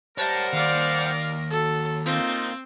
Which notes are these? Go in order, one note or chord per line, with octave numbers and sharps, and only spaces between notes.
G3 A#4 C5 C#5 E5 F#5 A5
D#2 D5 F5
F#3 A4
A#2 C4 D4 D#4 F4